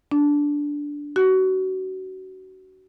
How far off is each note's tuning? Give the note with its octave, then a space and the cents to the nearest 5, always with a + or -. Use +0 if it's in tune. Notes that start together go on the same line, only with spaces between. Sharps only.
D4 -10
F#4 +25